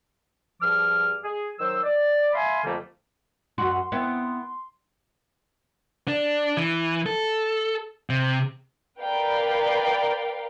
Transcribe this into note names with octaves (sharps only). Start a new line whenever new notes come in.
G2 F3 G#4 D6 F6
G#4
D#3 F#3 C5 E6
D5
E5 F5 G#5 B5 C6
F2 D3 F3 G3 A3 A#3
F#2 F#4 C6
B3 C4 E4
D4
E3
A4
C3
A#4 B4 D5 F5 G5